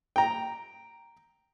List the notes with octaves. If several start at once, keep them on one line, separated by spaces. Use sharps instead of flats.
G5 A#5